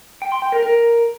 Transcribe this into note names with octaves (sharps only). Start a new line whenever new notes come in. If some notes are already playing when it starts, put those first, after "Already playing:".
G5
C6
G5
A#4
A#4